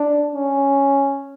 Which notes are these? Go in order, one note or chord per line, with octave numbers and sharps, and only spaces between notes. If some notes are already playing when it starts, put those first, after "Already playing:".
Already playing: D4
C#4